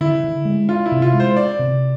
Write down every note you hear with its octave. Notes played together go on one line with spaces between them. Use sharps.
D3 E4
D3
G#3
D4 F4
E4
C3
F4
G#3
C5
D4 D5
C3